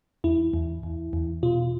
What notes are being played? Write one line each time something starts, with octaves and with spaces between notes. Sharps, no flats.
E2 E4
E2
E2
E2
B2 F4